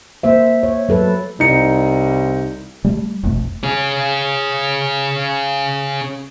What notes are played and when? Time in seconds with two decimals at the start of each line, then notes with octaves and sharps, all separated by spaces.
0.23 A#3 C5 E5
0.63 C#5
0.89 F#3 A4 B4
1.40 C2 D#4 C#7
2.84 G3 A3
3.23 F1 B1 F2 A3
3.64 C#4 G#4